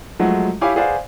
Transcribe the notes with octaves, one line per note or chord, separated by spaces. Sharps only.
F3 F#3 G#3 A3 F#4
E4 G4 C#5 F5 G#5 D6
G#4 B4 C5 D5 F5 F#5